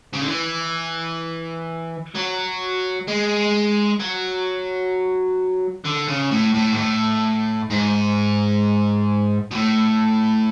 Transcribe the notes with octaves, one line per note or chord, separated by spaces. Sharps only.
C#3
D3
E3
F#3
G#3
F#3
D3
C#3
A2
A2
G#2
A2
G#2
B2
A2